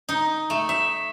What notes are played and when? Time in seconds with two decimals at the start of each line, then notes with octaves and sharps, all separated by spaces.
0.09 D#4
0.50 A3
0.69 E5